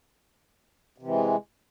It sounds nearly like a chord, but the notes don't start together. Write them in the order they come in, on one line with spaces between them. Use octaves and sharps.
C3 E3 G#3